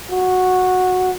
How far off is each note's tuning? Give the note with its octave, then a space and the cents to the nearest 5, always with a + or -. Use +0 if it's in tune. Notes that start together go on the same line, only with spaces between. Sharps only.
F#4 -10